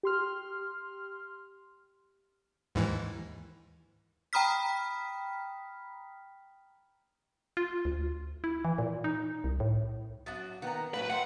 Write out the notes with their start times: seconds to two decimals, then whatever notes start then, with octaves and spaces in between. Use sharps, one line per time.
0.03 G4 C6 F6
2.75 D#2 G#2 E3
4.33 G5 A#5 B5 D#6 F6 B6
7.57 F4
7.85 D2
8.44 E4
8.65 E3
8.78 A#2
9.04 D#4
9.44 C2
9.60 A2
10.26 F#2 B3 D4 F#4
10.62 D#3 B3 F#5 A#5
10.94 A2 F#3 F#4 B4 F#5
11.10 E5 F#5 G5 B5 C6